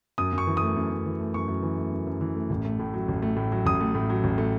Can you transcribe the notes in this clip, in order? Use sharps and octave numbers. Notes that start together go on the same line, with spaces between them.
F#2 D#6
F#2
C#6
E3
A3 D#6
F#2
F#2
E3
A3
F#2 C#6
F#2
E3
A3
F#2
F#2
E3
A3
A1
A3
A2
F#3
A1
A3
A2
F#3
A1 D#6
A3
A2
F#3
A1
A3